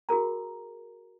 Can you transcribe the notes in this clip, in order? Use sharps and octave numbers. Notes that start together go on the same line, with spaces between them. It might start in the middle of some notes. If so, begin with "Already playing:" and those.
F#4 G#4 A#4 A#5